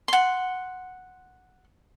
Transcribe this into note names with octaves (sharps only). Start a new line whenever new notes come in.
F#5 C6